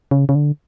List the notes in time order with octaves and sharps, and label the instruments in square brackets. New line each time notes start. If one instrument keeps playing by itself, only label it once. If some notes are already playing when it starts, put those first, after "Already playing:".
[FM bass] C#3
C#3
D3